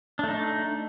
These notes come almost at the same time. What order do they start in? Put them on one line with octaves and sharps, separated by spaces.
D4 A3 D#4